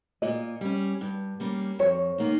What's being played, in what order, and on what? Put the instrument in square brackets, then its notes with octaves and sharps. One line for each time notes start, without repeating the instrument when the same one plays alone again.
[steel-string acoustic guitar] A#2 [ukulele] D#5
[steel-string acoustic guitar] G3 C#4
G2
G3 A#3 C#4
[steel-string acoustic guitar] F2 [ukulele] C#5
[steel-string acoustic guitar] D#3 A#3 D#4